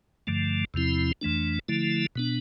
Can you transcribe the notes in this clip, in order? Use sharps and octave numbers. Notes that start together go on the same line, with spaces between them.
G2 D3 F3 A3
E2 C3 F3 C4 E4
F2 E3 A3 D4
D3 F3 A3 E4
B2 B3 D4